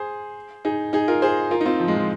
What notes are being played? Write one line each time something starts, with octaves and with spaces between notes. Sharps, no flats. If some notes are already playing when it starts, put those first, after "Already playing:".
Already playing: G#4 C5
D#4 G#4
D#4 G#4
F4 A#4
G#4 C5
F4 A#4
D#4
C4 F4
F3
G#3
F3